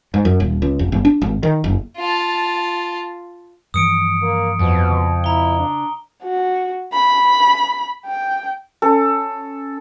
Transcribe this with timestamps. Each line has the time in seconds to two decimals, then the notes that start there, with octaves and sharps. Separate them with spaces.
0.14 G#2
0.25 F#2
0.40 D#1
0.62 C#2
0.79 F1
0.92 G1
1.05 D4
1.22 G#1
1.43 D#3
1.64 F#1
1.97 F4 A5
3.74 G2 E3 F3 D#6 C#7 D7
4.22 A#3
4.59 F2 B2
4.89 C#3
5.24 E4 A#5 G7
5.58 D4
6.23 F#4
6.93 B5
8.06 G5
8.82 C#4 A4